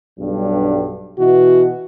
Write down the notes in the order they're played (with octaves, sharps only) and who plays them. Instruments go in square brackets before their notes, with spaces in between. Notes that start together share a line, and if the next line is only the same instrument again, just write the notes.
[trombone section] B1 G2
[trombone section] B2 E3 [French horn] F#4